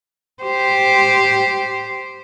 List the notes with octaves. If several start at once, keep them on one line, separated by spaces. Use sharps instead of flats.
G4 C5